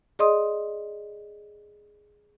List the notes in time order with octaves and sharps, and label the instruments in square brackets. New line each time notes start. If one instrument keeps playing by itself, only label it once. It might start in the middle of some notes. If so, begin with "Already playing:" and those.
[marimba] G#4 D5 D#5 C6 D#6